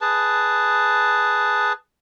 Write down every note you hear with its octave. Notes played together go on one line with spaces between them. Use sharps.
G#4 B4 A5